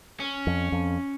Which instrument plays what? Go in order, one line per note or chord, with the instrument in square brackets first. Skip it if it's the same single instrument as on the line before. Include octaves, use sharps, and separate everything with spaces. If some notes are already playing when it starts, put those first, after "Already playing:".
[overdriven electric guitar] C#4
[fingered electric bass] F2
F2